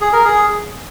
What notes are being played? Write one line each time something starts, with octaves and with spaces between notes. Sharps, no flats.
G#4
A#4
G#4